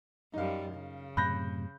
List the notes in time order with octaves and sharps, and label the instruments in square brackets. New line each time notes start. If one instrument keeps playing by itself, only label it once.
[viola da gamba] F#2 G3 [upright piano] D#4 F5
[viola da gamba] C#3
[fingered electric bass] F#2 A2 C3 [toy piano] B5 [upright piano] F#6 G6 A#6